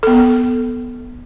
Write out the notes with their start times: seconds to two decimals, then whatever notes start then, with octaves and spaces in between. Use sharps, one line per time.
0.03 B3 A4